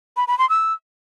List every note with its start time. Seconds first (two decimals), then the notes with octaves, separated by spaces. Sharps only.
0.17 B5
0.28 B5
0.39 C6
0.50 E6